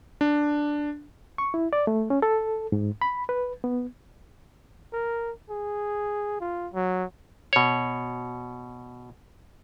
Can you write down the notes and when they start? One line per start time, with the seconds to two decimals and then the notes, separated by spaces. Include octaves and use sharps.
0.21 D4
1.38 C#6
1.54 E4
1.73 D5
1.87 A3
2.10 C#4
2.22 A4
2.72 G#2
3.02 B5
3.29 B4
3.64 B3
4.93 A#4
5.50 G#4
6.41 F4
6.73 F#3
7.53 B2 C#5